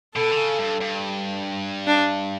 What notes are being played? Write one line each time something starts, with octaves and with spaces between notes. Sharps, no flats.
B2 A4
D3
C#3
G2
G2
D4